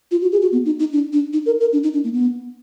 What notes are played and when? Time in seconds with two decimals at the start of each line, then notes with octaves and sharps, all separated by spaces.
0.11 F4
0.22 F#4
0.32 G#4
0.42 F#4
0.52 B3
0.66 D#4
0.79 D#4
0.93 D4
1.13 D4
1.33 D#4
1.46 A#4
1.60 A#4
1.73 D4
1.83 D#4
1.93 D4
2.04 A#3
2.13 B3